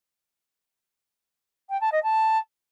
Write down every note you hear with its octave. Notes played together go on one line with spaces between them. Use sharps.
G5
A5
D#5
A5